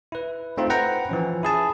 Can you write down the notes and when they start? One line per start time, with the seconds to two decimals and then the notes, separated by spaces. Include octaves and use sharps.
0.12 E4 B4
0.58 A3 C4 D#4 F4
0.70 B4 C5 F#5 G5 A#5
1.09 E3 F3 C#4
1.43 E4 G#4 A5